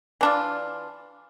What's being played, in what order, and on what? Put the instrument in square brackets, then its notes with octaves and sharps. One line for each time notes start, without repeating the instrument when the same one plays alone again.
[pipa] E3 D4 F4